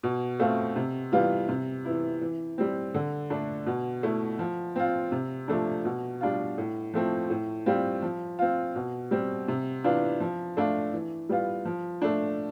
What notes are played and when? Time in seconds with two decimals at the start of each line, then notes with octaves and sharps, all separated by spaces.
0.03 B2
0.40 A3 C4 F4
0.76 C3
1.12 E3 G3 B3 F4
1.49 C3
1.85 E3 B3 E4
2.21 E3
2.58 G3 C4
2.95 D3
3.30 A3 D4
3.66 B2
4.03 A3 E4
4.39 F3
4.76 C4 F4
5.12 C3
5.48 F3 A3 D4
5.85 B2
6.21 G3 D4 F4
6.58 A2
6.94 F3 A3 C4
7.30 A2
7.66 G3 C4 F4
8.02 F3
8.39 C4 F4
8.76 B2
9.11 G3 C4
9.48 C3
9.84 E3 B3 D4 F4
10.20 F3
10.57 A3 D4 F4
10.93 E3
11.29 G3 B3 F4
11.65 F3
12.02 A3 D4